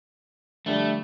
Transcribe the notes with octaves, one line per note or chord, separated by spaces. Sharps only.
D3 F3 G3 A3